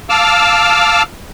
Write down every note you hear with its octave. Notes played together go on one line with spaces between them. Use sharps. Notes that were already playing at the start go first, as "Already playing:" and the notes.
F5 A5 D6 E6 F6